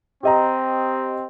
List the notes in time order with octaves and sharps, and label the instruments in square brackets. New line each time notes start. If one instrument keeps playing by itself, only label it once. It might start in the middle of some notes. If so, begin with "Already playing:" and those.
[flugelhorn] C4 [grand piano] G4 D#5 A#5